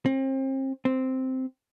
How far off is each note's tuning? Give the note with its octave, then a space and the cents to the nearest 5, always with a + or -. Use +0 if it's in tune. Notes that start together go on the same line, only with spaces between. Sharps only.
C4 +35
C4 -5